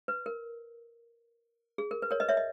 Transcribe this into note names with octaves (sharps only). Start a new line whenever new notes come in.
B4
A#4
G#4
A#4
B4
A#4 C#5
B4 D#5
C#5 E5
D#5